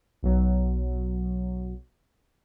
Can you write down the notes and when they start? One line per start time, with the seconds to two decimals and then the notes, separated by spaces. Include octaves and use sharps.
0.23 B1 F#3